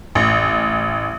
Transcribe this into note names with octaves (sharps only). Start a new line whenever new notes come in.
A1